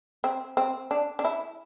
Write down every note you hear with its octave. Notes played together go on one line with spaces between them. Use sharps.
C4
C4
D4
D4
E4